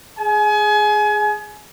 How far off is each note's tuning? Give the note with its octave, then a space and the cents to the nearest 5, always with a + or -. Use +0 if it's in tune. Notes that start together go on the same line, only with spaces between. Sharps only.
G#4 +0 G#5 +30